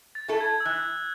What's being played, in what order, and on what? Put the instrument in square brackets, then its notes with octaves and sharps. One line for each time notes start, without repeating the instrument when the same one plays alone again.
[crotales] A6
[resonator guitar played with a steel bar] A3 E4 A4
[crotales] G#6
E6
[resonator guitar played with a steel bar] E3 [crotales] F#6